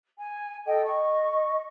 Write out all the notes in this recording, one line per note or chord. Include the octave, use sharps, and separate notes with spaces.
G#5
A4 D#5 G5
D#5 C#6